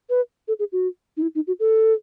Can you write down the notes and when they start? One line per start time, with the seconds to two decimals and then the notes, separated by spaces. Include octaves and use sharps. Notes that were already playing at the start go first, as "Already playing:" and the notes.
0.10 B4
0.48 A4
0.59 G#4
0.72 F#4
1.17 D#4
1.22 E4
1.35 D#4
1.47 F#4
1.60 A4